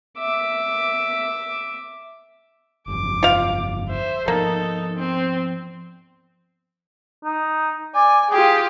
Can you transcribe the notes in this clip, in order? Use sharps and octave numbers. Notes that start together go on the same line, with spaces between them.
E5 D6
G1 F2 D6
F4 F5
C5 E5
F3 A#3 B3 D#4 A4
C4
D#4
D5 G#5
F4 G4 G#4 G5